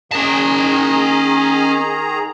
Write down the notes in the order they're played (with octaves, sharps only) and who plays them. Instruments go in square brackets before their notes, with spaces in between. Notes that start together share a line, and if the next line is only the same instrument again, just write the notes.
[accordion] D#3 G#4 A#5 [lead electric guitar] C#4 A5